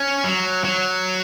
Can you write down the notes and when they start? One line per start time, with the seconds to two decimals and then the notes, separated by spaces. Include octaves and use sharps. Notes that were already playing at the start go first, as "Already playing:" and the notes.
Already playing: C#4
0.24 F#3
0.64 F#3